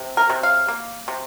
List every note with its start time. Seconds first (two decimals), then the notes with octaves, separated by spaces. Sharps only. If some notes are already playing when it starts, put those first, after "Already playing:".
Already playing: C3
0.17 A#4
0.30 C3
0.43 F5
0.68 A#3
1.08 C3